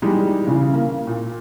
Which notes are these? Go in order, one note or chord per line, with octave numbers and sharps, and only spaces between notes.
E3 G3 G#3 D#4
C#3 E3
A#3
A#2